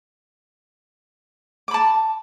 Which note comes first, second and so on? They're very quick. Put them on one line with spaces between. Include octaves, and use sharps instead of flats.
D6 B5 A5